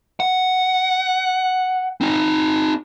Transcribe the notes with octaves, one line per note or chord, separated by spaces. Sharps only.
F#5
C4 D#4